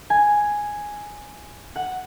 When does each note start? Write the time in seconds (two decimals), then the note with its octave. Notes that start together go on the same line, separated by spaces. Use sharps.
0.10 G#5
1.76 F#5